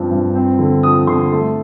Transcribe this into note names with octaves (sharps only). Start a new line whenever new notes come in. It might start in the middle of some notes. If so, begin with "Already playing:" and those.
Already playing: G2 F3 C4
G2
C4
D3
F3 D#6
D3 C6
A3